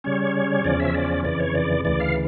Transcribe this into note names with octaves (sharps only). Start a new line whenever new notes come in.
C#3 G3 C#4 C#5
E2 C#3 F3 C#4 D5
E5
D5
F2 C#3 E3 D5
C#5
D5
D2 C#3 E3 D5
F5